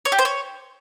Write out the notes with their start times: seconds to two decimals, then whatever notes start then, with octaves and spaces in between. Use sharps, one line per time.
0.05 C#5
0.12 G4
0.18 C5
0.25 C#5